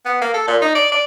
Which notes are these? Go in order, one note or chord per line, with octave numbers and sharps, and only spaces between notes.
B3
A#3
A4
A#2
D#4
D5
D5